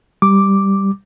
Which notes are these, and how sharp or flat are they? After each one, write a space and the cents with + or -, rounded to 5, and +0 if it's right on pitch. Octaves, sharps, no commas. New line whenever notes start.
G3 +0 D6 +0